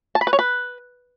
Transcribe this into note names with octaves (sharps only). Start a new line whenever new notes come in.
A5
B5
B4
C#5
B4